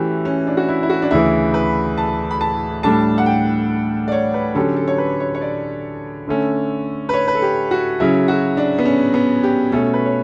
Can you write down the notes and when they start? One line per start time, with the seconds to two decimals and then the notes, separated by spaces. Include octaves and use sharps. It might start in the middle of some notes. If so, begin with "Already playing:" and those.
Already playing: E3 A3 C#4 E4 F#4 G4
0.25 C#4
0.47 D4
0.57 F#4
0.69 E4
0.83 E4
0.90 F#4
1.02 D4
1.11 D2 C#3 E3 E4
1.54 B4
1.97 A5
2.31 B5
2.41 A5
2.83 A2 G3 D4 A4 A5
3.18 F#5
3.26 G5
4.08 D5
4.12 C#5
4.34 B4
4.55 D3 F#3 C#4 G4 A4
4.76 A4
4.88 C#5
4.98 B4
5.20 C#5
5.35 C#5
5.41 D5
6.28 D3 A3 C#4
7.09 B4
7.14 C#5
7.28 B4
7.35 A4
7.42 G4
7.71 F#4
8.00 C#3 F#3 C#4 E4
8.28 F#4
8.57 D4
8.78 B3
8.86 C#4
9.14 B3
9.43 G4
9.72 B2 A3 C#4 A4
9.94 B4
10.06 C#5